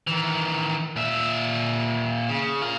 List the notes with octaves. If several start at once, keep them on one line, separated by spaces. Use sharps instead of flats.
D#3 E3
A#2 E5
C#3
F4 A#4